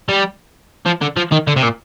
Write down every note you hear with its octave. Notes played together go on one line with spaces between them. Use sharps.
G3
F3
D3
F3
D#3
D3
C3
A#2